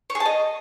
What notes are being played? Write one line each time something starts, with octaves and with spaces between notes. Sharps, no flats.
C#5
G#4
A5
D#5